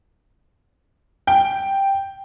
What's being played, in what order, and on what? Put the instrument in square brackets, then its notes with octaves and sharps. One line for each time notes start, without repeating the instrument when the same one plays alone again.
[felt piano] G5